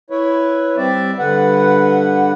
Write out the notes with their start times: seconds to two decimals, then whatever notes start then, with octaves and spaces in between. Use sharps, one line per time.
0.10 E4 B4 C#5
0.77 G3 C4 D5 E5
1.19 G2 D3 B4 F#5